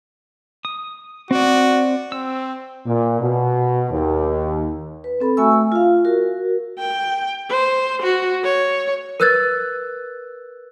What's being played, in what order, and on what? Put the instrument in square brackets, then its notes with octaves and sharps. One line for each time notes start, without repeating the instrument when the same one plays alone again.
[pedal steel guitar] D#6
[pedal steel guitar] C4 D5 [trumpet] F#4
[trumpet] C4 [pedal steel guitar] E6
[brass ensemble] A#2
B2
D#2
[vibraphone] B4
C4 A4 B5
A3 F#4 E5 G#5 C#6 E6
F4 F5
F#4 A#4
[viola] G5
C5
F#4
C#5
[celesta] A#4 B4 E6 F#6 G#6 A6